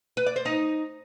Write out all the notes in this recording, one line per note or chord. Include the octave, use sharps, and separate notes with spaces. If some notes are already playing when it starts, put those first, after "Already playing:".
B4
D5
C5
D#4